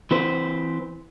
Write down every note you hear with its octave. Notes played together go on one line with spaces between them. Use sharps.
E3 C4 B4 C5